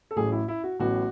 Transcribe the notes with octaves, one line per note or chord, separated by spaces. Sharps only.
A4
A1 A2 F#3 G#4
E4
E4
F#4
A1 A2 F#3 B3 F#4